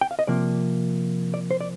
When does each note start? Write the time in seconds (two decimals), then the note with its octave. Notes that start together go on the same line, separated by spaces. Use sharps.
0.01 G5
0.11 F5
0.19 D#5
0.27 C3 F3 A#3 D5
1.34 D5
1.51 C5
1.61 D5